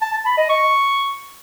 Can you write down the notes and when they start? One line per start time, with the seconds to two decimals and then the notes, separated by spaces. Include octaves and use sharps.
0.01 A5
0.13 A5
0.25 B5
0.37 D#5
0.49 C#6